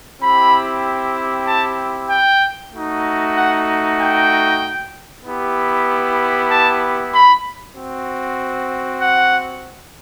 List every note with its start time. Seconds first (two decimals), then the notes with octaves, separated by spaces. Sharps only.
0.21 C4 E4 G4 B5
1.47 A5
2.09 G5
2.72 A3 D#4 F#4
3.34 F#5
3.98 G5
5.23 B3 E4 G4
6.48 A5
7.12 B5
7.74 C4 F#4
9.00 F#5